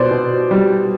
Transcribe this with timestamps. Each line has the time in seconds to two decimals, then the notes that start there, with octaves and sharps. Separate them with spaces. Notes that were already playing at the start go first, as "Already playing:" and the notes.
Already playing: B2 C5 D5
0.11 B2
0.51 G3